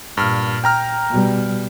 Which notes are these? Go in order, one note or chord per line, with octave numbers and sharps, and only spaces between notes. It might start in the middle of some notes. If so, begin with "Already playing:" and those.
G2 A#2 F6
G5 A#5 F6
B2 G3